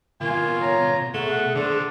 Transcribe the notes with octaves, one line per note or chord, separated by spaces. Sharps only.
D#2 B2 F4 A#4 G#5
C#5 A#5
B2 A3 G#4 F#5
D#2 D3 D4 C5